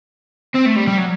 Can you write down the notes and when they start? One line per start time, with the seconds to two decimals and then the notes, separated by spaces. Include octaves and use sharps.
0.54 C4
0.65 A3
0.76 G3
0.87 G3
0.98 F#3